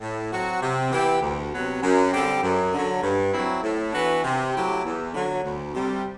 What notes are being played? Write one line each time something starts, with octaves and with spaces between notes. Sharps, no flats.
A2
F#3 C4 F#4
C3
E3 B3 E4 G4
D2
C3 F#3 B3
F#2
D3 G3 C4 G4
F#2
D3 F#3
G2
F#3 C4 E4
A2
E3 B3 D4 F#4
C3
F#3 A3 E4 G4
E2
D3 F#3
D2
C3 G3